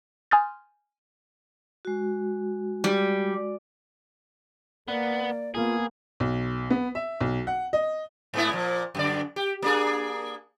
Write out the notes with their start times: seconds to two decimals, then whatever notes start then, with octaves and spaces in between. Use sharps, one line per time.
0.31 G#5 C6 D#6 F6 G6 A6
1.85 G#3 F#4
2.84 G3
4.88 A#3 B3 D5
5.55 A#3 B3 F4 G#4
6.20 B1
6.70 B3
6.95 E5
7.20 B1
7.47 F#5
7.73 D#5
8.34 G#2 B3 E4
8.52 A#2 F3
8.95 F#2 D3 D5
9.36 G4
9.62 A#3 D4 G#4